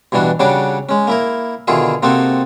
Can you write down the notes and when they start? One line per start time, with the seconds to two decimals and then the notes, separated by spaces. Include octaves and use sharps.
0.12 G2 B2 E3 D4 F#4
0.40 C#3 G3 D4 F#4 C#5 D6
0.89 G#3 C#4
1.07 A#3 E4 A#4
1.68 B2 D3 D#3 E4 F4 G#4
2.03 C3 A#3 C4 D#4 F#4 A4